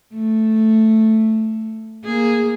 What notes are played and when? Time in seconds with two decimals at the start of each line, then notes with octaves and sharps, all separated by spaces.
0.14 A3
2.04 A#3 G#4